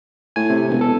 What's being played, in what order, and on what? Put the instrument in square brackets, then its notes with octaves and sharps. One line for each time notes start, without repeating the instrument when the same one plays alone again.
[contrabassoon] A2 [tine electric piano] G#5
[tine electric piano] C3
[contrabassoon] E1
[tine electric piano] A4